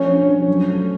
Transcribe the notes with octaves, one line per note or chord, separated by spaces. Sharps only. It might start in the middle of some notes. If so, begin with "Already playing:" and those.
Already playing: F3 A3 C#4 C#5
D4
F3
F#3
A3